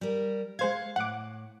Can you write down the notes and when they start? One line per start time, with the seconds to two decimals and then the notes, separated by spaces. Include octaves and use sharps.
0.01 G3 A#4
0.59 G#3 C5 F5 F#5 G#6
0.96 A2 F#5 D6